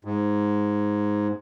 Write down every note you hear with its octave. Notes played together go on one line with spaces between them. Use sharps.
G#2